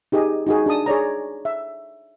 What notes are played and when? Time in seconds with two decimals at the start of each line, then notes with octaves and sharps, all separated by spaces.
0.12 D#4 G4 G#4 D#5
0.47 D#4 F#4 G#4
0.66 D4 G#4 A5 D#6
0.86 G#4 C#5 D5 A#5
1.45 E5